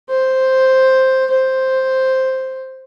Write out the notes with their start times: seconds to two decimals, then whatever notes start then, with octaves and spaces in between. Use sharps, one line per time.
0.09 C5
1.31 C5